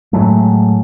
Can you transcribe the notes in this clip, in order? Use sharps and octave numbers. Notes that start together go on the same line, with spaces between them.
A2 F#3 G#3 A3